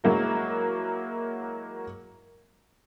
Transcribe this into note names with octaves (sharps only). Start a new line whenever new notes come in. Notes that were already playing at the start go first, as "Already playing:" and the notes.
F#3 G#3 A#3 E4 F#4